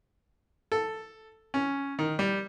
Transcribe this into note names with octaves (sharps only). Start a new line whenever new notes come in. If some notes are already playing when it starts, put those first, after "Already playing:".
A4
C#4
D#3
G3